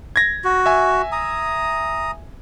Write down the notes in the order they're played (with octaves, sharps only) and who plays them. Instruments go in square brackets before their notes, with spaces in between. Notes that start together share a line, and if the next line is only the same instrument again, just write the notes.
[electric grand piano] G#6 A#6
[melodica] F#4
[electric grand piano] E5 G#5
[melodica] A#5 D#6